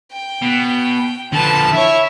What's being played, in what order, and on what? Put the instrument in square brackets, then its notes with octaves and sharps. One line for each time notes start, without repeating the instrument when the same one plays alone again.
[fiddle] G5
[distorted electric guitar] B2
[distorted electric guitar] D3 F3 [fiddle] B4 A5
[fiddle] E4 C#5 [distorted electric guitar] E5